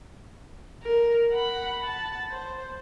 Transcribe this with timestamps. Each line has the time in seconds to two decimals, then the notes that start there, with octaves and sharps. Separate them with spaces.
0.83 A#4
1.33 F#5 B5
1.83 A5
2.30 C5